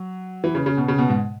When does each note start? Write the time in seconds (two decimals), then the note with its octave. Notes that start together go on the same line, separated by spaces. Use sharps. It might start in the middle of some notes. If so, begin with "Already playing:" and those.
Already playing: F#3
0.44 E3
0.55 C#3
0.66 C#3
0.77 B2
0.88 C#3
0.98 B2
1.09 G#2